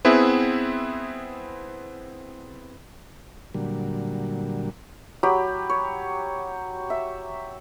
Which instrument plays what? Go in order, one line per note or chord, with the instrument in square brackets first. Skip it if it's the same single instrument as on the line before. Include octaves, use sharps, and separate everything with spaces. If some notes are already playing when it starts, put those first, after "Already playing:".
[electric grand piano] B3 C4 E4 G#4 B4 E5
[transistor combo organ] A#2 D3 F#3 G3
[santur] F#3 G4 B5
C#5
E5